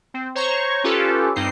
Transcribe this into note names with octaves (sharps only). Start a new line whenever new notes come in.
C4
C5 C#5 A#5 C#6
C#4 F4 G4 A4 B4
G2 C4 D#4 C7